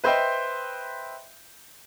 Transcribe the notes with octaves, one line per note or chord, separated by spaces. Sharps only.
B4 C5 D#5 E5 G5 C6